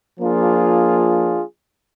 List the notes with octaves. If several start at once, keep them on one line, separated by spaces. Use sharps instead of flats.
F3 A#3 D4 F4 G#4